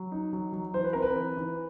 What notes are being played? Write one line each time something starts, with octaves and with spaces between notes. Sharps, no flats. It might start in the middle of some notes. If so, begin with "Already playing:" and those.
Already playing: F#3
D#4
F#3
F#3
E3 C5
B4
C4 A#4
B4
E3
E3